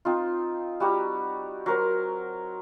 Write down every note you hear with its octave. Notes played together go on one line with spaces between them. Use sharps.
C4 D#4 F4
G3 F#4 G4 A#5
F#3 A#4 C5